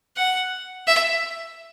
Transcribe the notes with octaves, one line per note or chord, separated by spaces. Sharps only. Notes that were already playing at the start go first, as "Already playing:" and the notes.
F#5
E5